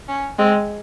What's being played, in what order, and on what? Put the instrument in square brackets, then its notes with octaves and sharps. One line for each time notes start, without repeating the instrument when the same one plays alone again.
[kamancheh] C#4
[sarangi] G#3 [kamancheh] C4